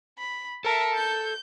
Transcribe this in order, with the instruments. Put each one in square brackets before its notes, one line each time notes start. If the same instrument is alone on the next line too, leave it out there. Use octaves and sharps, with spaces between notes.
[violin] B5
[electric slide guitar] A4 A5 [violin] A#4 E5
[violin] G6